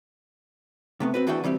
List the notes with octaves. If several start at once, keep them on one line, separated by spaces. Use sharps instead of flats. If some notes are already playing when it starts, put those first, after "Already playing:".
C3 A3 B3
C4 F#4 B4
E2 E3 D4 F#4 F#5 G5
E3 G3 C4 G4